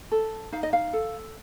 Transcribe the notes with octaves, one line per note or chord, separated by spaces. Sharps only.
A4
D#4 F5
D#5
F5
A4